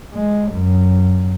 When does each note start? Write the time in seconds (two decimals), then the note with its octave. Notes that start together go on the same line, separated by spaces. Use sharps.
0.14 G#3
0.53 F#2